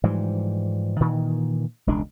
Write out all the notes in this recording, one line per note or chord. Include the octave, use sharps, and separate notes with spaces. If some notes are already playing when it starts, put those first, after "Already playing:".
G#2 E3 F3 G3
A#2 D#3 E3
E1 C#2 G#3 D4